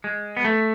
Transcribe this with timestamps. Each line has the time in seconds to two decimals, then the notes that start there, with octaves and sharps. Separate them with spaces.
0.04 G#3
0.37 B3
0.45 A3